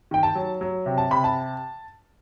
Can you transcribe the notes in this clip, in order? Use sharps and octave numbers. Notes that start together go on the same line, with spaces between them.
D#3 G5
A5
F#3
F#3
C3
A5
C3 B5
A5